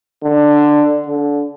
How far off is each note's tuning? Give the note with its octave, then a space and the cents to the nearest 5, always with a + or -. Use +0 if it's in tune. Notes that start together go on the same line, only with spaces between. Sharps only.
D3 +10
D3 -25